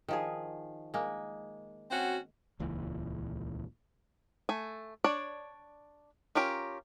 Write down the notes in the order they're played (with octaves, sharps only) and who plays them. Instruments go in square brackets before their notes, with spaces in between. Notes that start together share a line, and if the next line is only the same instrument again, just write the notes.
[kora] D#3 F3 G#4
G#3 A#3
[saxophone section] C4 C#4 F#4
[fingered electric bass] D#1 C#2 A#2 E3
[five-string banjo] A3 G#5
D4 C#5 D5
C#4 F4 G4 A#4